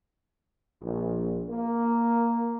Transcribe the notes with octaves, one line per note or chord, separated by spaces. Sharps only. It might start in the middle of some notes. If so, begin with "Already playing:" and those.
A#1
A#3